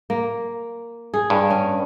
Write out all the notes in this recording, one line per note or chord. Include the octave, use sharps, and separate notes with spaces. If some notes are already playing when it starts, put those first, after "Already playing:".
A#3
G#4
G2
C#4